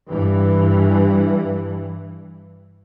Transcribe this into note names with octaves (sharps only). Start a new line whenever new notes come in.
G2 E3